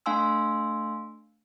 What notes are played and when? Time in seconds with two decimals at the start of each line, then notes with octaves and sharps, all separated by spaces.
0.06 A3 D4 F5 G#5 C6 E6